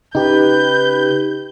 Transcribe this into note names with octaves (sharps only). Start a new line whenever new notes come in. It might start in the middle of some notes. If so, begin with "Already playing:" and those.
C#3 D#4 G4 B4 G6